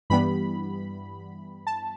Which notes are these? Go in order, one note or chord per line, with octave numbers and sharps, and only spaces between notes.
G2 E3 G3 B3 B5
A5